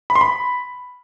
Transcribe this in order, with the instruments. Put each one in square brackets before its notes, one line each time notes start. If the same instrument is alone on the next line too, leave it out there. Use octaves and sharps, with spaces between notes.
[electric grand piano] B5
C6
B5